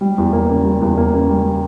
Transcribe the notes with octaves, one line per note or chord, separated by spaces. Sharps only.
G3
E2
A#3
C#3
G3
E2
A#3
C#3
G3